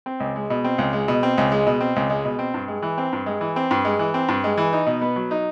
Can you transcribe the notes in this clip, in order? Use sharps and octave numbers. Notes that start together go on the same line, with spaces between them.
C4
C#2
G#3
B2
C4
C#2
G#3
B2
C4
C#2
G#3
B2
C4
C#2
G#3
B2
C4
G2
G#3
E3
C4
G2
G#3
E3
C4
G2
G#3
E3
C4
G2
G#3
E3
D#4
B2
B3
F#3
D#4